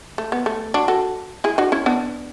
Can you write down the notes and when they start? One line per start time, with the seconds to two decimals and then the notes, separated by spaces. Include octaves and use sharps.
0.18 A3
0.32 B3
0.46 A3
0.74 D4 F#4
0.88 F#4 A4
1.44 E4 G#4
1.58 D4 F#4
1.72 C#4 E4
1.86 B3 D4